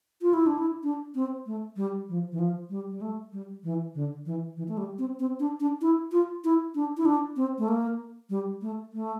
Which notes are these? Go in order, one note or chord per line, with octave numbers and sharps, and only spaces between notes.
F4
E4
D4
E4
D4
C4
A3
G3
F3
E3
F3
G3
G3
A3
G3
E3
D3
E3
E3
A3
G3
C4
C4
D4
D4
E4
F4
E4
D4
E4
D4
C4
A3
A#3
G3
A3
A3